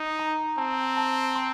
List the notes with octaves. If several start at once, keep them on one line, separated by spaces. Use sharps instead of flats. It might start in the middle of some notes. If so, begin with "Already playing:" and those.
Already playing: D#4
A#5
C4 A5
A5
C6